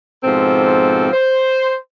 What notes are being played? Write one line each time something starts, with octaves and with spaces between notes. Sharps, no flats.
G#2 B2 F3 C4 A4
C5